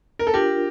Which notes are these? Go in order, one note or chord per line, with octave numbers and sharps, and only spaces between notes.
A#4
A4
D4 F4 G4 A#4